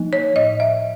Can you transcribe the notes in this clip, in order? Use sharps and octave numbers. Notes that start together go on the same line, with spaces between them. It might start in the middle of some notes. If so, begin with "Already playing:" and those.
Already playing: F3 A#3 D#4
C#5
A2 D#5
E5